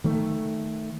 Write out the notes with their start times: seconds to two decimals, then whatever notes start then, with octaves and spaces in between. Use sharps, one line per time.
0.04 D#3 A3